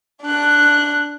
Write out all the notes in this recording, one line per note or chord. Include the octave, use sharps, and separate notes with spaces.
D4 F#6